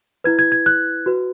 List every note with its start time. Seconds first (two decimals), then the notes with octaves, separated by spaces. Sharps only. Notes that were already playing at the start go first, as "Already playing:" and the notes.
0.24 E4 B4 G#6
0.39 G#6
0.52 G#6
0.66 F#6
1.06 F#4 B4